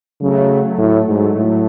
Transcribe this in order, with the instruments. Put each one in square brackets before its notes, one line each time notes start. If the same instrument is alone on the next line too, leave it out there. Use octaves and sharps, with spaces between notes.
[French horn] C#3 [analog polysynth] F#3 A3
[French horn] A2
G#2
A2